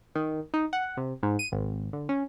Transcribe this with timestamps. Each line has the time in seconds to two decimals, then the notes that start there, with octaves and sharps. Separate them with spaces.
0.15 D#3
0.54 D#4
0.73 F#5
0.97 C3
1.23 G#2
1.39 D#7
1.52 G#1
1.93 D3
2.09 C#4